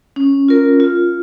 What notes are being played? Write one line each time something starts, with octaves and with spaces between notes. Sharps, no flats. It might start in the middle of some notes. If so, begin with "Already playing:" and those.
C#4
F4 A#4
F4